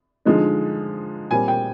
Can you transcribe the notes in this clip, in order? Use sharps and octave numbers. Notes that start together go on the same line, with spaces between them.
D3 F3 G#3 D#4
A#2 G3 C4 G#5
G5